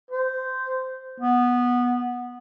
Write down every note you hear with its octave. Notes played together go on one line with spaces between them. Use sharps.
C5
B3